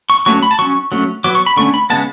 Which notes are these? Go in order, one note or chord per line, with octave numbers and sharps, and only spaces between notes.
C#6
F#3 A3 C#4 C#6
B5
A5
F#3 C#4 C#6
F#3 A3 C#4
F#3 B3 D6
C#6
B5
D3 A3 C#4 C#6
B5
C#3 G#3 B3 A5